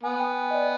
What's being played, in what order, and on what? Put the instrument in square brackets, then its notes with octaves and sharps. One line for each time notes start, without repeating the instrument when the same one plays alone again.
[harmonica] B3 [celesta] G#5
[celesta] G5
G#5
D#5
D5